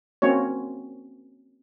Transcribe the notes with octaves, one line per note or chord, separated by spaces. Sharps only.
A#3 C4 C#4 F#4 C#5